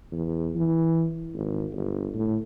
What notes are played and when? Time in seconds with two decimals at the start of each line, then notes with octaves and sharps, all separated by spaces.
0.12 E2
0.55 E3
1.34 G#1
1.72 G1
2.14 A2